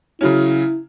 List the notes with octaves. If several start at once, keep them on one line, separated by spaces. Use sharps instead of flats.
C#3 F#3 C#4 E4